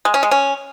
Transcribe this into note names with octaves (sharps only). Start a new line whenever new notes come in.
G#3
C#4
G#3
C#4